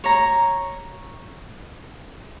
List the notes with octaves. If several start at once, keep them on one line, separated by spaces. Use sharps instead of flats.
C#5 A#5